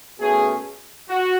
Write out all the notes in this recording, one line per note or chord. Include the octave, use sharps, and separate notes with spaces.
B2 A3 C#4 G#4
F#4